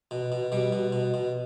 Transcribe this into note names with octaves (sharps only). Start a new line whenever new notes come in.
B2
B2
B2 G3
B2
B2
B2